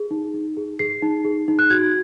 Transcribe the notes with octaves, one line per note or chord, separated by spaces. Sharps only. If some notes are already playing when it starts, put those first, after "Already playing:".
Already playing: G#4
D#4
D#4
G#4
G#4 C7
D#4
G#4
D#4
F#6
F#4 G#6